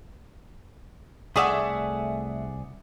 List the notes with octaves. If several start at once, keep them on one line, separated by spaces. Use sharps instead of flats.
C2 A3 G#4 D5 E5 F#5 G#5 D#6